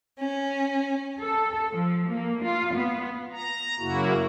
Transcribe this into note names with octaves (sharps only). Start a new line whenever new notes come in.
C#4
A4
F3
A#3
F4
B3
A#5
F#2 C#3 A#3 E4 F#4